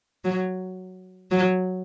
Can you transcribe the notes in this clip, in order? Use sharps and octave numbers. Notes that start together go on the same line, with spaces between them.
F#3
F#3